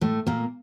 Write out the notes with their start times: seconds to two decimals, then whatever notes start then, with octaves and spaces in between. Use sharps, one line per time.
0.01 A2 A3
0.27 A#2 A#3